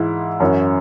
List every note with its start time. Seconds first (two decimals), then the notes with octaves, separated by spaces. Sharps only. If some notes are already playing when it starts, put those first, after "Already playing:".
Already playing: G#2 E3 G#3 E4
0.40 F#2 E3 C#4 E4